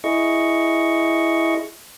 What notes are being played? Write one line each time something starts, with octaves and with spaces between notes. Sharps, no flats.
E4 G#4 D#5 C#6